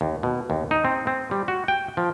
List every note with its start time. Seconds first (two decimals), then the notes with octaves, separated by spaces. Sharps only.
0.01 D#2
0.23 B2
0.50 D#2
0.71 D#4
0.85 C4
1.07 C4
1.31 G3
1.48 F#4
1.68 G5
1.97 F3